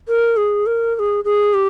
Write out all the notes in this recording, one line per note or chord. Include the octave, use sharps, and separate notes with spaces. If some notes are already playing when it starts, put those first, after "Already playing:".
A#4
G#4
A#4
A#4
G#4
G#4
G4